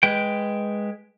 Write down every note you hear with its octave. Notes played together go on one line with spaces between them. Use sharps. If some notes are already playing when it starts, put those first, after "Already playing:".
G#3 B4 G5